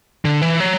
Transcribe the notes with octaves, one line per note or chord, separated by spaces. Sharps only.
D3
E3
F#3